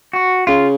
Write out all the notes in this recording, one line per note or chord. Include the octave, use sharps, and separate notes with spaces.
F#4
C#3 F4